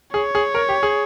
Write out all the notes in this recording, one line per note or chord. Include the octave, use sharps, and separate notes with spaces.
G#4 C#5
G#4
A#4
G4
G#4